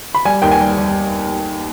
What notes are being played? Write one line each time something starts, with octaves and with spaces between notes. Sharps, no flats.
B5
G3 G#5
D#2 G5
G#5
G3
G3